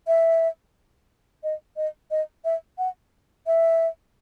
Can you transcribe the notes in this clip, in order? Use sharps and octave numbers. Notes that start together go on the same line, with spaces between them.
E5
D#5
D#5
D#5
E5
F#5
E5